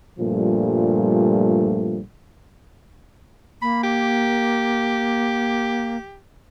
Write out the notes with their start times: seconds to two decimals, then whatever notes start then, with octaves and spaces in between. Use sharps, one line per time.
0.19 G2 A#2 F3 G3 A3
3.62 A#3 B5
3.83 G4